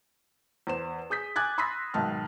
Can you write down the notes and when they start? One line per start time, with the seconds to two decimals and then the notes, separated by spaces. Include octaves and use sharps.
0.67 E2 C5 E7
1.10 G#4 D#6 G6 B6
1.36 G#5 D6 F#6 G#6 A6
1.58 B5 C6 D#6 E6 A#6 B6
1.94 B1 G#2 D#3 A5 F6